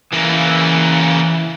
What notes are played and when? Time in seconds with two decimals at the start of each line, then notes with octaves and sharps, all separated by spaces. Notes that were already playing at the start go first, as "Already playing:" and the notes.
0.12 C#3 E3 A#3